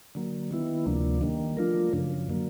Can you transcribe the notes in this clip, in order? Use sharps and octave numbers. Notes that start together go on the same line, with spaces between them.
D3 F#3 A#3
D#3 G3 B3 E4
D2 C3 F3 A#3 D4
D#3 G3 A#3
F3 A3 D4 F4 A#4
F#2 C#3 F3
D3 F#3 A#3